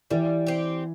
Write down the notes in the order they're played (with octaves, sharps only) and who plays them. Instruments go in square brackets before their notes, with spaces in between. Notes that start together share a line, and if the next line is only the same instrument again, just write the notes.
[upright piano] E3 [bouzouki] G3
[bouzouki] C4 G4